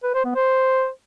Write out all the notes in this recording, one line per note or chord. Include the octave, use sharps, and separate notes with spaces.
B4
C5
B3
C5